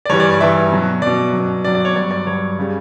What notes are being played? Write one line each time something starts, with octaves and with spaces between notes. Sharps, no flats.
D5
G2 E3 G3 C#5
D5
D5
G2 E3 G3 E5
B2 F#3
B2 F#3 D5
F#3
B2
B2 F#3 D5
D5
C#5
G2 F#3 D5
D5
G2 F#3 C#5
C#3 G3